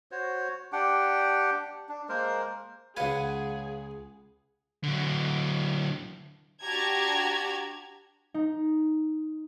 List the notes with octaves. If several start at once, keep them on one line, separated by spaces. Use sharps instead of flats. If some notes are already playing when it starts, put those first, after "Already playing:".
F#4 C5 C#5
D4 G4 F#5 G5
D4
G#3 A#3 A#4 C5
C#2 G#4 B4 F5 F#5 G#5
D3 F#3
D4 F#4 G4 A5 A#5 G#6
D#4